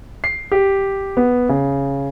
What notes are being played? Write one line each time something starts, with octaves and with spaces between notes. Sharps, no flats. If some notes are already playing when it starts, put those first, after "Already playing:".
C7
G4
B3
C#3